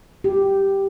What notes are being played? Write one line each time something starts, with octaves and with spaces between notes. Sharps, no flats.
G4